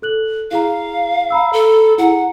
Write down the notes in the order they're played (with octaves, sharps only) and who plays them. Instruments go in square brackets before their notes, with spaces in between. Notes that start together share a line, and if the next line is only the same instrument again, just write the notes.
[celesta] A4 F#6 F#7
[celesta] E4 G#4 A#5 [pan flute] F5
[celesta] A#5 B5 E6
[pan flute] A4
[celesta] E4 G#4 A#5 [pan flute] F#5